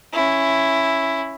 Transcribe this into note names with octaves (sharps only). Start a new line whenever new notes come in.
C#4 E4